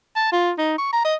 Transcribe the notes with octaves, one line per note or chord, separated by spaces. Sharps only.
A5
F4
D#4
C#6
A#5
D#5